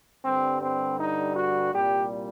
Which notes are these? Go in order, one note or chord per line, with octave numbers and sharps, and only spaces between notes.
G2 D3 G3 C4
C4
D#4
F#4
C2 A#2 G3 G4